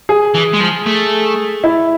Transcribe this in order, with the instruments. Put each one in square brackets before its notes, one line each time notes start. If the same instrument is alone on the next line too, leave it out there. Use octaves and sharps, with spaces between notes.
[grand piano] G#4
[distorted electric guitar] E3
G#3
F3
A3
[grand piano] E4